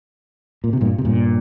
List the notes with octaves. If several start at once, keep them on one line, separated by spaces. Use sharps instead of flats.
A#2
C3
G2 A#2
C3
G2 A#2